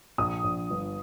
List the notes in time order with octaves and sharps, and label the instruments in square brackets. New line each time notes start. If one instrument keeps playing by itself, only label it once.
[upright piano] A#1 [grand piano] D#6
[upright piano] A#1
G1